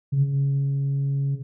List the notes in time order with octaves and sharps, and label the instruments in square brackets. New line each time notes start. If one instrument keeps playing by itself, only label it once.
[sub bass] C#3